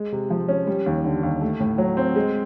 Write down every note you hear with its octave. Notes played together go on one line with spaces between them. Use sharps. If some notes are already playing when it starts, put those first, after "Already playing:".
Already playing: G#3
C3
F3
C#4
G3
D#2
D3
D#2
A3
A2
F#3
C4
G#3